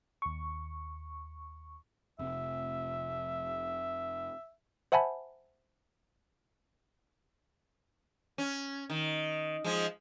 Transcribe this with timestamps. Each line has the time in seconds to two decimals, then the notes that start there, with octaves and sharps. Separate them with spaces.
0.22 D#2 C#6
2.19 F1 C3 E5
4.92 C5 E5 F#5 G#5 A5 B5
8.38 C#4
8.90 D#3
9.64 F3 G#3